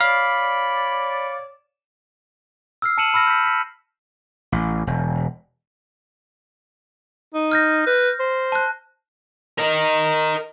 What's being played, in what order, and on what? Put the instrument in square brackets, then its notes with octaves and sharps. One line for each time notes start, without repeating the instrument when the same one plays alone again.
[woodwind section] C#5 D5 [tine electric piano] F5 [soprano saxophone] B5
[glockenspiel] E6 F6 C7
A5 E6 C#7 D#7 E7 F#7
B5 E6 F6 A#6
G6 B6
B6
[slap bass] A1
E1
[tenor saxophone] D#4
[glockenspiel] F6 G6 A#6
[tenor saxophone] B4
C5
[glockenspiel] A5 F#6
[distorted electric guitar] A#4 D#5